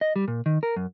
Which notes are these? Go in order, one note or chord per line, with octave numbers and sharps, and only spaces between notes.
D#5
G3
A#2
D#3
A#4
F#2